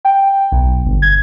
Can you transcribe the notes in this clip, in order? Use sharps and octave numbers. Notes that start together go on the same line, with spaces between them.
G5
B1
G1
G#6